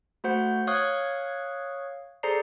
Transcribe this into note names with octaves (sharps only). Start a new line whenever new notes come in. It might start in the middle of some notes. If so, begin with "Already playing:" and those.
A3 F#4 C5 F#5 G6
C#5 F5 C#6 D#6 F#6 G#6
G#4 A4 C5 D5 A#5 C7